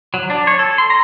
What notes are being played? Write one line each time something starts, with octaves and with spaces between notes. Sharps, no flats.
F#3
D4
C#5
A4
C6
A#5